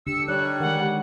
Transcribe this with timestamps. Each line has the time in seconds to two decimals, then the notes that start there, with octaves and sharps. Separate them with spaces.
0.07 D3 D4 G4 E6 C#7
0.28 G3 D#4 C#5 D5 F#6
0.60 D#3 G#3 F#5